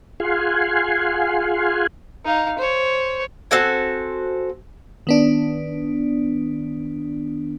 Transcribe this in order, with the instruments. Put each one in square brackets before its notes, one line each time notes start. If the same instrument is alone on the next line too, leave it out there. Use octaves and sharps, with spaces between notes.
[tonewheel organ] F4 G#4 F5 F#5 G#5 C6
[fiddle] D#4 F5
C5 C#5
[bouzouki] C4 F#4 A4 G#5
[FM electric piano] D#3 B3 D4